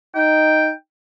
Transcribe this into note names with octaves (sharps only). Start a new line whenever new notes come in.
D#4 G5